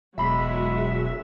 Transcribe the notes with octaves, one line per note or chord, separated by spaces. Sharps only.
E1 B1 F#3 G#3 F#4 E5 B5